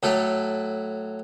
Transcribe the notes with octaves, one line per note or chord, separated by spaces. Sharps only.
A2 F#3 A4